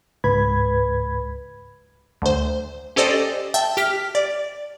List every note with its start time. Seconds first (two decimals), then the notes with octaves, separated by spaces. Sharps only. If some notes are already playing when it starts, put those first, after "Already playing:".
0.24 C#2 G#2 B4 B5 G#6
2.22 D2 C5
2.96 C#4 G4 A4 C5 D5 D#5
3.54 E5 G5 A5
3.77 G4 F6 B6
4.15 D5